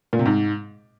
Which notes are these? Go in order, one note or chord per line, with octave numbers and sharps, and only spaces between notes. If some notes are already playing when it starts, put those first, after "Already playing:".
A#2
C3
G#2